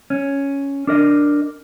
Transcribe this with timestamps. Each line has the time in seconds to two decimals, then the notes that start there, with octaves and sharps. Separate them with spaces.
0.10 C#4
0.87 D4 A#4 D#5